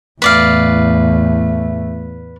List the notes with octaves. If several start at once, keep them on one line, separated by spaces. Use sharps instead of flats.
E2 A2 A3 B4 D5 F5